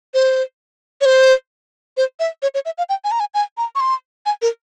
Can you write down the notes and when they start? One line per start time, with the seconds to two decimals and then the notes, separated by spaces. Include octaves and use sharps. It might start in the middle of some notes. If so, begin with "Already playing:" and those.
0.14 C5
1.01 C#5
1.05 C5
1.97 C5
2.20 E5
2.42 C#5
2.55 C#5
2.65 E5
2.78 F5
2.89 G5
3.04 G#5
3.11 A#5
3.20 G#5
3.34 G#5
3.58 A#5
3.75 C#6
3.80 C6
4.26 G#5
4.42 A#4